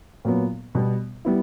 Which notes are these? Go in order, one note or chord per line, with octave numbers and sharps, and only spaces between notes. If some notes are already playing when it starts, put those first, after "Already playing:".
A#2 F#3 B3
B2 G3 B3
G3 B3 E4